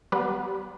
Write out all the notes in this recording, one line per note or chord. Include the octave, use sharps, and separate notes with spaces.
G3 B3